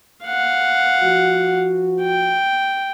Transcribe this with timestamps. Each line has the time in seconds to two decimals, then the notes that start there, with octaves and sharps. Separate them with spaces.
0.25 F5 F#5
1.02 F3 F#4
2.02 G5